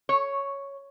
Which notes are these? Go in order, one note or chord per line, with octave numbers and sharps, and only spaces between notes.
C#5